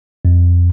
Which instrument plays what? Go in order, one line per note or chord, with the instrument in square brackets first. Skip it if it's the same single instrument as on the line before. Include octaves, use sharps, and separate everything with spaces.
[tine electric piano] F2